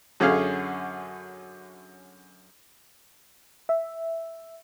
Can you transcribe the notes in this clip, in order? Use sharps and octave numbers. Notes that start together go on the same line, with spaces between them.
F#2 D3 C#4 G#4 F5
E5